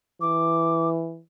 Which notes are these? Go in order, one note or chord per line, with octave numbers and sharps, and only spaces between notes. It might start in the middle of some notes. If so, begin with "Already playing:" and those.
E3 D6